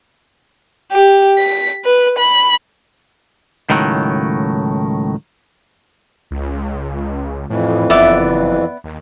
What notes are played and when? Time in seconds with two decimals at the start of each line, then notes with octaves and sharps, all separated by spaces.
0.92 G4
1.39 B6
1.85 B4
2.18 B5
3.70 C#2 A2 D#3 F#3
6.31 C#2
7.50 F2 A2 E3
7.90 F#1 B3 D5 E5
8.84 D#2